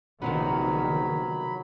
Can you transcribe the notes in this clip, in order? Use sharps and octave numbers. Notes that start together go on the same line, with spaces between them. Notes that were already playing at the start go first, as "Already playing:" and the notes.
A#1 C3 D#3 F3 F#3 B3 B5